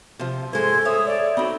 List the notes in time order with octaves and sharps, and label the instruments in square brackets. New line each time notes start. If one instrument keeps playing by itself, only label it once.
[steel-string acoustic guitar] C3 F3
[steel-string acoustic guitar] G#2 G#3 C5 [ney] A4 [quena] G#6
[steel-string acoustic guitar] C#5 E5 [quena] D#6
[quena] D5
[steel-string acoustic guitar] C4 D#4 [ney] F#4 [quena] B5